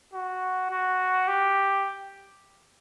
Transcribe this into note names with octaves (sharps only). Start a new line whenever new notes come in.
F#4
F#4
G4